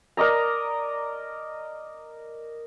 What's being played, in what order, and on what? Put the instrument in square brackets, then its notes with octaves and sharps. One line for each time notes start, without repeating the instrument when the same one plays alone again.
[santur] A#4 D5 D#5 A#5